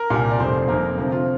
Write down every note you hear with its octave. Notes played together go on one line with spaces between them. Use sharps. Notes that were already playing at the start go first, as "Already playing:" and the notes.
Already playing: A#4
C2 A#2 G3
D5
F1 F2 C3 C5
F2 C3 A#3 A#4
D2 C3 F3
F4